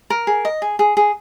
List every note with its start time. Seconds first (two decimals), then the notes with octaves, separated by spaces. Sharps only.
0.10 A#4
0.27 G#4
0.45 D#5
0.62 G#4
0.79 G#4
0.97 G#4